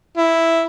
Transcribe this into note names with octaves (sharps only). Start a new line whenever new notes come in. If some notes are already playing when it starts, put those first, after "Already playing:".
E4